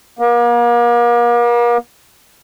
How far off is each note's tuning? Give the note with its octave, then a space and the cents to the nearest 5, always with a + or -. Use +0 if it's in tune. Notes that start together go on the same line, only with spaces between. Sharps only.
A#3 +40